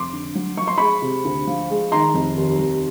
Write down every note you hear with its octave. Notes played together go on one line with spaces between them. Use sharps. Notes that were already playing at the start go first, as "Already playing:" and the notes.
Already playing: F1 C6 D6
D3
F#3
F3 C#6
C6
G#3 B5 C#6
C3
D2
F3
G#3
D#3 A#5 C6
F1
D#2
F1